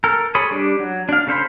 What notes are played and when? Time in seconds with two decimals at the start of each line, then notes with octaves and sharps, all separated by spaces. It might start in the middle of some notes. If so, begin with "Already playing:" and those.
0.04 A4 A#4
0.35 G#4 A4 C#5 B5 D#6
0.51 G3 D4
0.79 F#3
1.09 D4 F5
1.27 C#3 A4 C5 B5